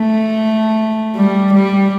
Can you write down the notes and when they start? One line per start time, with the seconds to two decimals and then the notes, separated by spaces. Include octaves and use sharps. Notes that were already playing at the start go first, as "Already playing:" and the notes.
Already playing: A3
1.16 G3
1.53 G3